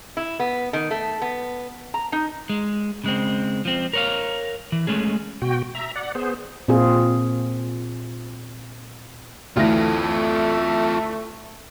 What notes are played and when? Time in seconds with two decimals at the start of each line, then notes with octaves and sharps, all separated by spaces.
0.17 E4
0.40 B3
0.73 D#3
0.91 A3
1.22 B3
1.94 A#5
2.12 D#4
2.50 G#3
3.04 C#3 G#3 C4
3.65 F3 C4
3.93 A#4 C#5 F5
4.72 E3
4.87 G#3 A3 C#4 G#4
5.42 B2 F#4 G5
5.75 E5 A#5
5.95 D5 F#5
6.15 B3 G#4 C5
6.68 A#2 C4 F4 G#4
9.57 D2 E3 A3 F4 A4 A#6